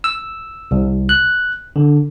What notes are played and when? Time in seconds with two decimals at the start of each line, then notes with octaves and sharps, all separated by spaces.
0.04 E6
0.71 C2
1.09 F#6
1.76 D3